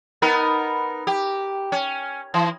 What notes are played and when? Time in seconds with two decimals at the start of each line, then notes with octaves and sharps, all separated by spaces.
0.22 B3 D#4 A#4
1.07 G4
1.72 C#4
2.34 E3